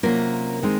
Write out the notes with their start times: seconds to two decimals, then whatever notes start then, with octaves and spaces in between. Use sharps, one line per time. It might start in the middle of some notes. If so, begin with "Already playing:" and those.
0.03 C3 F#3 A#3 C#4 F4 A#4
0.62 D#3 G#3 C4 D#4